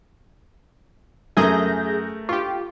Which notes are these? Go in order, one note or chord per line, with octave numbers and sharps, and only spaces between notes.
F#2 A3 G#4 A#4 D#6 G6 A#6
F4 G4 C#6